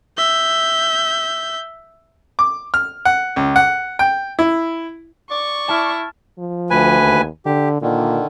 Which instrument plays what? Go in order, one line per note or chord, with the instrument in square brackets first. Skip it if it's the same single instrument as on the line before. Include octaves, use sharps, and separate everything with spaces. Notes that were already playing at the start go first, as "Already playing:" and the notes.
[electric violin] E5 G6
[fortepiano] D6
F6
F#5
C#2
F#5
G5
E4
[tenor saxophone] D5 [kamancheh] C#6
[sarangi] E4 [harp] A5 F6
[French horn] F3
[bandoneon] D2 B4 G#5
[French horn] D#2
[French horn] D3 [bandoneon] G4
[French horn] A#2 [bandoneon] D3 D#3